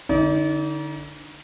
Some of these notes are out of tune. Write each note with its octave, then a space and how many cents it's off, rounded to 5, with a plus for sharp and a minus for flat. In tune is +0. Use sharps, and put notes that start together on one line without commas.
D3 +0 D#4 +30 D5 -35